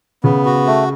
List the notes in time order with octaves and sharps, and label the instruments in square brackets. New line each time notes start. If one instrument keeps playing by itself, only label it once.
[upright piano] C#3 [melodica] B3
[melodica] F#4
A3